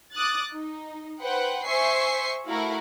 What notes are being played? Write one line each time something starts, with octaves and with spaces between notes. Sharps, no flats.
D6 D#6 F#6 A6
D#4
B4 C5 F#5 G5
C5 E5 G#5 C#6 C7
A3 E4 F#4 A#4 F5